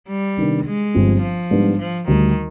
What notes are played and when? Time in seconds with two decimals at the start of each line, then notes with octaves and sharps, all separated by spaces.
0.08 G3
0.37 C3 D#3 B3 D4
0.65 G#3
0.94 G1 G2 F3 C4
1.22 F3
1.51 G#2 G3 B3 D4
1.79 F3
2.08 D2 D3 D#3 G3